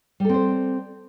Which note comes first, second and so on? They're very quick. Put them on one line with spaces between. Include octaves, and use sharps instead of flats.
G3 A4 C4 C5